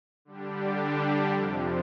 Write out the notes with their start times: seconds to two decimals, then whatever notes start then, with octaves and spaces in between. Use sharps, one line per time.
0.25 D3 G3 D4 G4
1.30 F2 C3 F3